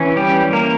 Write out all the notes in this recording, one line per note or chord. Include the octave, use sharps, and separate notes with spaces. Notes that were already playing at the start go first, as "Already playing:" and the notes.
Already playing: E3 C#4
G3 G4
A#3 A#4